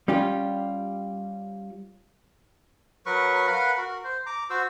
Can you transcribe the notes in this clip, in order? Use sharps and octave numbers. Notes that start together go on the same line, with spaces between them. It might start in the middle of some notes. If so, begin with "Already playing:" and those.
G3 C#4 F4 G4
F#3 A#4 B4 C#6
A#4 B4 F5 F#5
F#4 A#4
C5
A#5 D6
F#4 C5 E6